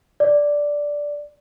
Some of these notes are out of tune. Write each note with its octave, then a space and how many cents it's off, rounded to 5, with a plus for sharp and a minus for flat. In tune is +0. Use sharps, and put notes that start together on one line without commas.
D5 -5